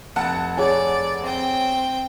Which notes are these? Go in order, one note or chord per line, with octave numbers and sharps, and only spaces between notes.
F1 F#5 A5
G#4 C#5 D5 G#5
C4 G5